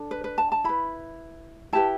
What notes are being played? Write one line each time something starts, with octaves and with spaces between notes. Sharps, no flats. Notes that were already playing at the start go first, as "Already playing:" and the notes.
Already playing: D4 A4
B4
B4
A5
A5
E4 B4 B5
E4 G4 B4 A5